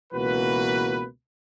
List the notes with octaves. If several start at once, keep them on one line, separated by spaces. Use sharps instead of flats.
C#2 B2 E3 A#3 F#4 B4